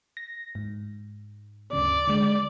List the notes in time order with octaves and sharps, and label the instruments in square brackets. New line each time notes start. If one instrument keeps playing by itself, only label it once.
[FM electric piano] A#6
G#2
[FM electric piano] D2 G2 C#3 [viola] D5
[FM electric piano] D3 G#3